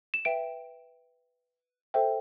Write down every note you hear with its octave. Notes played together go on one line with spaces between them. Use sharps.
E7
B4 E5 G5 D7
A4 C5 E5 G5